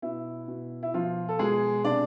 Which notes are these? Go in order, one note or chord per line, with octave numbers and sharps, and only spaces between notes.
B2 E4
B2
E4
B2 F3 F4
A4
B2 G#3 G#4
C3 D4 D5